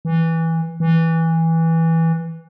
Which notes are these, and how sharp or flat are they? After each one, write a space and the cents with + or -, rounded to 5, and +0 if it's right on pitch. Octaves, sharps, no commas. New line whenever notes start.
E3 -10
E3 -10